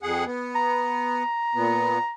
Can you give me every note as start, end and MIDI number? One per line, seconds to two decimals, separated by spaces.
0.03 0.24 41
0.03 0.24 68
0.03 0.24 78
0.26 1.23 59
0.55 2.14 82
1.55 1.98 46
1.55 1.98 59